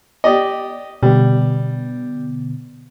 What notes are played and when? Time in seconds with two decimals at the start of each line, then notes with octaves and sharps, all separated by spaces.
0.24 G4 D5 D#5
1.03 B2 D3 G3 B3